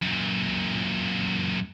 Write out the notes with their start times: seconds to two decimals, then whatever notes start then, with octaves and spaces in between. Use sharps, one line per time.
0.02 F#2 A#2